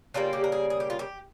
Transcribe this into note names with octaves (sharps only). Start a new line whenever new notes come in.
C#3 G3 A#3 F4
G4
A#4
G#4
G#4
G4
F4
G4